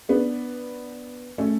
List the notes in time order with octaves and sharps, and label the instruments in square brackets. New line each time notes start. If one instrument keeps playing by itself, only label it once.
[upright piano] B3 D4
A3 C#4